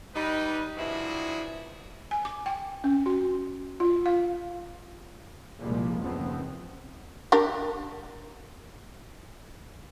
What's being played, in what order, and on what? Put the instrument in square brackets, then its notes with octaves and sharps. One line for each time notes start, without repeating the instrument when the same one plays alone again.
[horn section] G3 D#4 B4
G2 C3 F3 E4 F#4 G#4
[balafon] G#5
D6
G5
C#4
F#4
F4
F5
[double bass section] C2 A#2 F3 G3 G#3 A#3
F#1 D#2 C#3 F3 B3 C4
[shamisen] D4 G4 A#4